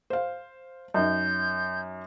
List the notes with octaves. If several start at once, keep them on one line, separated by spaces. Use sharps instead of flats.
C5 F5
F#2 D#4 G6